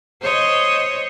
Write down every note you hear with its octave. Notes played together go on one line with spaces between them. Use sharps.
C5 C#5 D#5